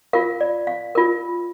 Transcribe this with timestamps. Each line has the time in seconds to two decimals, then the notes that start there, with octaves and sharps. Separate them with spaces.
0.13 F4 A#4 F5
0.41 D5
0.67 F5
0.95 F4 A#4